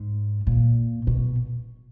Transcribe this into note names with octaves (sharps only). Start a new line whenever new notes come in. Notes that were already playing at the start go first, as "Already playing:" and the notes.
Already playing: G#2
A#2
B2